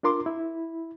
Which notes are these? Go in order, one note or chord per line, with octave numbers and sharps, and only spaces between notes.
D4 F4 A#4 C6 D6
E4